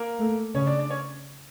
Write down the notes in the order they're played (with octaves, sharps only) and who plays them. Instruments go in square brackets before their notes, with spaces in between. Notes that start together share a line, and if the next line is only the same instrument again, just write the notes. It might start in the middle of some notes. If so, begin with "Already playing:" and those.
Already playing: [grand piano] A#3 A#4
[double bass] A3
[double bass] C#3 [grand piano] C#4 C#5
[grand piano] D4 D5
D4 D5
C#4 C#5